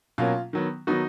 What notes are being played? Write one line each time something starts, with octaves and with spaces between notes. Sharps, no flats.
B2 F#3 A#3 C#4 F4
D#3 F#3 B3
D#3 F#3 B3 D#4 F#4